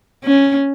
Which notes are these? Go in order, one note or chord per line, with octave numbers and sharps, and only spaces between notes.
C#4